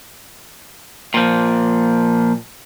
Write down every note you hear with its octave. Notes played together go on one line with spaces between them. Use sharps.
A#2 F3